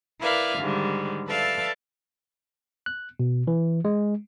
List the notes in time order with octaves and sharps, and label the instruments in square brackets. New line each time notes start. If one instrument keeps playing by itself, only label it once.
[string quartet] E4 A#4 B4 D5 E5 F5
G#2 D3 D#3 G3
A4 B4 D5 E5 F5 A5
[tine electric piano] F#6
B2
E3
G#3